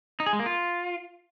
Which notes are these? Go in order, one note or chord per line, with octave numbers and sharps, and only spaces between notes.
D#4
G#4
G#3
A#3
F4